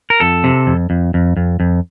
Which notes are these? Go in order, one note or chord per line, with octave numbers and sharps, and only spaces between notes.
A#4
F2 A4
C3
F2
F2
F2
F2
F2